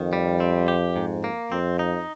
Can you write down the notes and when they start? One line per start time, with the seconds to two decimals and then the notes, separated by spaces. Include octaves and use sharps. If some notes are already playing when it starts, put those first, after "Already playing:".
Already playing: F2 D#3
0.13 G3
0.40 C4
0.68 G4
0.96 G#2
1.24 A#3
1.52 F2 C4
1.79 D#4